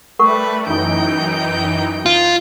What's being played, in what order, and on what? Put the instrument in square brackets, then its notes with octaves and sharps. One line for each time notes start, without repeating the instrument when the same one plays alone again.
[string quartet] G3 B4 [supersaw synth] A3 [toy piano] A#4 F#5 C#6
[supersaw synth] F#2 E3 D#4 [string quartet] G5 G6
[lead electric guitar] F4